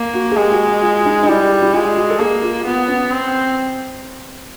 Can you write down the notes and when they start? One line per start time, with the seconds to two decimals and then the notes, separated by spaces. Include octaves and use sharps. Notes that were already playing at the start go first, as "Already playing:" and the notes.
Already playing: A#3
0.13 F#4
0.31 G#4
0.36 G#3 G4
0.51 F#4
0.67 F#4
0.82 F4
1.06 D#4
1.23 D#4
1.28 G3 E4
1.62 E4
1.74 G#3 F4
1.96 F#4
2.10 A4
2.19 A#3 G#4
2.42 F4
2.65 B3 F4
2.87 C#4
3.11 C4